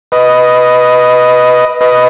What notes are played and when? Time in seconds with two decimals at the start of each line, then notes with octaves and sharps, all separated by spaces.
0.12 B4 D#5
1.81 B4 D#5